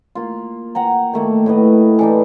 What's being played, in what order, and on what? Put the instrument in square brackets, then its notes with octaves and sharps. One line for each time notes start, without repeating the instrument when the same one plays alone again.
[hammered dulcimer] A#3 F4
F#5 G5 A#5
D#3 A3 A#3
A2 B4 D#5
E3 D4 D#4